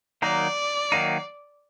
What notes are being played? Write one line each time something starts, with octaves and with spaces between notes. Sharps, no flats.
D#3 F#3 A#3 D#4 D5
D#3 F#3 A#3 D#4